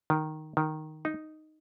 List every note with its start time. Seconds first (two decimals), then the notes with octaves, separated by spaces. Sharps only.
0.10 D#3
0.57 D#3
1.05 D#4